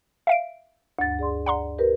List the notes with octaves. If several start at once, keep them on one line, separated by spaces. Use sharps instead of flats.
E5 F5 D7
D2 G2 A6
G#4 D5 C6
D5 F#5 A#5 C6
G4 A#4 B4